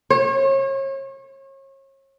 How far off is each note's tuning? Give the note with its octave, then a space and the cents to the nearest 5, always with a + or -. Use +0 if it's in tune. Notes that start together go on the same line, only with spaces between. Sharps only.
C#5 -35